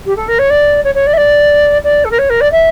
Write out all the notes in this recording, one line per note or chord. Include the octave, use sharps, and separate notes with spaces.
G4
A4
A#4
C#5
D5
C#5
C#5
D5
E5
D5
D5
A4
A#4
C#5
A#4
D5
E5